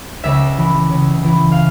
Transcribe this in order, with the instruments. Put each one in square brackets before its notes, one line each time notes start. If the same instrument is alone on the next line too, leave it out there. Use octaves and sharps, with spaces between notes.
[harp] C#2 E5
E3
C#3
E3
F5